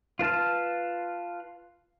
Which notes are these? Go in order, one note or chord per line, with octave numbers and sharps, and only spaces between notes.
F4 B4 A5 F6